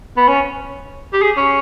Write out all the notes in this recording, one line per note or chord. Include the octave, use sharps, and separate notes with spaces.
B3
C#4
G4
G#4
C#4